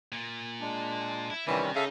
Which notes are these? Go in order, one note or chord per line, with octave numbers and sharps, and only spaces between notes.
A#2
G#3 D4
E4
C3 D#3 E3 G3 C#4
C#3 D#4 A4 E5 F5